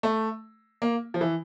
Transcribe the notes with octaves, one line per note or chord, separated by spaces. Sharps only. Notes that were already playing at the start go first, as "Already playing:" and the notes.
A3
A#3
F3
E3